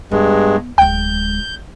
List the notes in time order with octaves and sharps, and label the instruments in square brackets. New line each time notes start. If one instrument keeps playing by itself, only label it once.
[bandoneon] G2 G#3 [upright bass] B3
[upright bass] D1 G#3 [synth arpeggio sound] G5 [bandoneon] G6